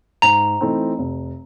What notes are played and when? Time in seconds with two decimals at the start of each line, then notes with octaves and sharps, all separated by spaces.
0.22 G#2 A#5
0.61 E3 A3 C4 D#4
0.98 F1